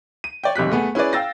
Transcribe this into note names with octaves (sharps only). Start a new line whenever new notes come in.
D#7
C#5 D5 G5
D#1 B1 C3 F#6 B6
A3 B3 G#4
C#4 E4 G#4 B4 D5
F5 G5 E6 A6 A#6